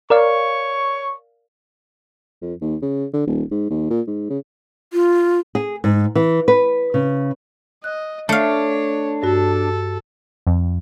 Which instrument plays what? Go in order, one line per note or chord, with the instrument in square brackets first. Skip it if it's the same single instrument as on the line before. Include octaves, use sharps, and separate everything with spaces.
[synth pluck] A#4 D5 F5 [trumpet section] C#5 C#6
[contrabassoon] F2
D#2
C#3
D3
D#1
G#2
D#2
A#2
G#2
C#3
[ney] F4
[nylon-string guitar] G#4
G#2
E3
B4
C#3
[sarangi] D#5 [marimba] F#6
[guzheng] A3 F5 [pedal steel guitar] D4 [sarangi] C#5
[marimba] G2 F#4 [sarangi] A4
[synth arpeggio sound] F2